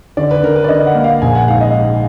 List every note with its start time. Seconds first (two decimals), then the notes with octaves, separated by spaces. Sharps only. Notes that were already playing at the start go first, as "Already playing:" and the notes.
0.17 D3 D5
0.31 B4
0.43 D3 A#4
0.56 B4
0.64 D5
0.69 D3 D#5
0.87 F#5
0.95 A#3
1.04 F5
1.22 A#1 G#5
1.35 F#5
1.47 G#2 F5
1.61 D#5
1.73 G#2